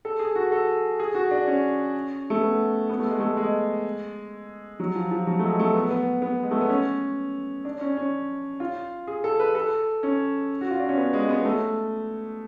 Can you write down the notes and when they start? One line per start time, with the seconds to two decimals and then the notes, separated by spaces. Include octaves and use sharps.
0.05 A4
0.19 G#4
0.35 F#4
0.52 A4
1.00 G#4
1.15 F#4
1.31 D4
1.47 C#4
2.30 A3
2.42 B3
2.89 B3
2.99 A3
3.09 G#3
3.20 A3
3.37 G#3
4.80 F#3
4.95 F3
5.11 F3
5.27 F#3
5.39 A3
5.43 G#3
5.59 A3
5.75 B3
5.91 B3
6.22 B3
6.43 G#3
6.51 A3
6.61 B3
6.69 C#4
7.65 D4
7.81 C#4
7.97 C#4
8.60 F4
9.07 G#4
9.24 A4
9.40 B4
9.55 A4
10.03 C#4
10.61 F#4
10.71 F4
10.80 D4
10.89 C#4
10.98 B3
11.13 G#3
11.29 B3
11.45 A3